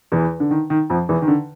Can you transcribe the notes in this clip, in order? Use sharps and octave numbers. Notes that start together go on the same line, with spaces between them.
E2 E3
D3
D#3
D#3
F2 F3
E2 E3
D#3
D3